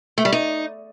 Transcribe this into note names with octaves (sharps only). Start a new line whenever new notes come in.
A3
G3
D#4